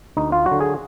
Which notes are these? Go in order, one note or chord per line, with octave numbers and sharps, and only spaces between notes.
D2 D#4
F4
F#3 F#4
D3
G#4